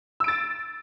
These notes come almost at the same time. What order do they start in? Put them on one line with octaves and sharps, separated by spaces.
E6 D7 A6